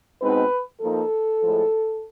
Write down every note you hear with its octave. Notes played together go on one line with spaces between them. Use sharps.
B2 G#3 C4 D#4 B4
F3 A#3 D#4 A4
A2 F3 G#3